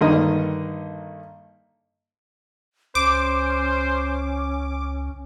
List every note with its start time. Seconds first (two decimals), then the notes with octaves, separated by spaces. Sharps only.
0.01 G2 D3 D#3 A#3 D#5
2.95 C#2 C#4 C5 D6